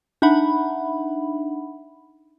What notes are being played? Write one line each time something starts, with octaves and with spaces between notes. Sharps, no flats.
D4 D#4 E5 F#5 B5